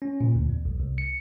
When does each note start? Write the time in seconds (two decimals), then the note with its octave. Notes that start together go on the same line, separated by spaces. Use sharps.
0.02 C#4
0.21 A#2
0.35 D2
0.49 E2
0.65 B1
0.80 C2
0.98 C#7